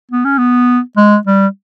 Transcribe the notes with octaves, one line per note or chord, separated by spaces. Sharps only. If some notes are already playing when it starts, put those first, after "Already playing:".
B3
C#4
B3
G#3
G3